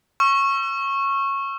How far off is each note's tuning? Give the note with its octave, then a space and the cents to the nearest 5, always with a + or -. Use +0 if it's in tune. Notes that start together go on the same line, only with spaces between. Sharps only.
C#6 -15 E6 +45